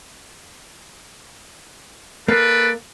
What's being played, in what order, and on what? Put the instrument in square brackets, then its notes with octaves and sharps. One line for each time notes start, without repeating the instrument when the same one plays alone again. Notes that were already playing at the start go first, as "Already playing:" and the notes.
[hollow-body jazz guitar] A#3 [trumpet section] A4 B4 D5